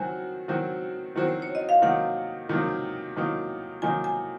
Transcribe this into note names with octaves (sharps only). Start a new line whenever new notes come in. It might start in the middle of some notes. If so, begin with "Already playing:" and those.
Already playing: D#3 F#3 C4 F#4 G#5
D#3 F#3 C4 F#4
D#3 F#3 C4 F#4
C5
C#5
D#5
F5
C3 D#3 F#3 A#3 D#4 F#5
C3 D#3 F#3 A#3 D#4
C3 D#3 F#3 A#3 D#4
C3 D#3 F#3 A#3 D#4 G#5
G#5